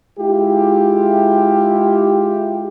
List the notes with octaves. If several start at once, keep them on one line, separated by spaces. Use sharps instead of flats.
G#3 E4 F4 G4